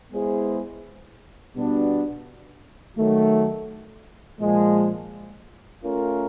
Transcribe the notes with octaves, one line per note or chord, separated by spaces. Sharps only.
G#3 B3 E4 G#4 C5
B2 G3 B3 D4 F#4
D#3 F#3 A3
A#2 F3 G#3
A3 C#4 F4 A#4